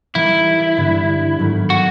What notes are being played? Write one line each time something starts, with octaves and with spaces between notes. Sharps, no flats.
E3 G3 A#3 D#4 E4
G2 D3 G3 B3
G#2 D#3 F#3 A3
F#4